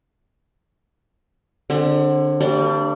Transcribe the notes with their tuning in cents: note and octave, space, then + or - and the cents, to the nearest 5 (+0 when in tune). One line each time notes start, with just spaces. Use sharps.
D3 +20 G#3 +0 C4 +40
G3 +0 A#3 -45 D4 +0